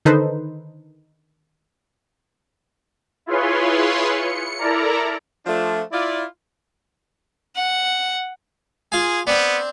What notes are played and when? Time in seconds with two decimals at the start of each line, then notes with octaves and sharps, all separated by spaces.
0.05 D3 D#3 D#4 A4 B4 C5
3.26 E4 F4 G#4 B4 C#5 C6
4.12 C#7
4.59 E4 A4 A#4 D5 A#5
5.46 F3 A3 D4
5.92 E4 F4 D5
7.56 F#5
8.92 F4 G#4 G#5
9.27 B3 C4 D4